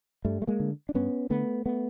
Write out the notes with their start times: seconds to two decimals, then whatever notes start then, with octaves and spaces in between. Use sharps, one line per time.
0.25 G2 G3 A3
0.42 A3
0.47 G#3 A#3
0.60 D3
0.89 D4
0.95 G2 B3 C#4
1.30 D3 A3 B3
1.66 A3 B3